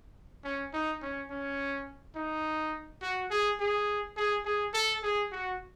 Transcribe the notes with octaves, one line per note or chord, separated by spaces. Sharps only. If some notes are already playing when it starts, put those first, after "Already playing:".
C#4
D#4
C#4
C#4
D#4
F#4
G#4
G#4
G#4
G#4
A4
G#4
F#4